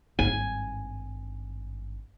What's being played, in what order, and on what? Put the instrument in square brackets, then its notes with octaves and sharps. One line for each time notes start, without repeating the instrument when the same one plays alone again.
[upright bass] G#1 G2 [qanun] G#5